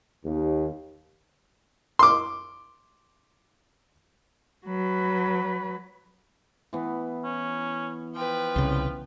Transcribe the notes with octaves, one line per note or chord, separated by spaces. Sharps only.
D#2
C6 D6
F#3 B4
E3 B3
C#4
F3 B4 G5
C2 C#3